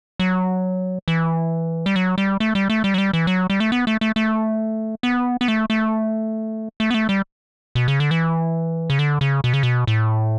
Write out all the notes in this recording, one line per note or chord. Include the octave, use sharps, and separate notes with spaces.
F#3
E3
G3
F#3
G3
A3
G3
A3
G3
F#3
G3
E3
F#3
G3
A3
B3
A3
A3
A3
B3
B3
A3
A3
A3
B3
A3
G3
B2
C#3
D3
E3
C#3
D3
C#3
B2
C#3
B2
A2